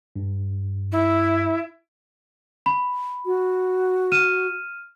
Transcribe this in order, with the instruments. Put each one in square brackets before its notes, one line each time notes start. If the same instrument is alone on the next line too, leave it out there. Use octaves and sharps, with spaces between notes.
[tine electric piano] G2
[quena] E4
[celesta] B5
[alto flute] F#4
[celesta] F6 D#7 E7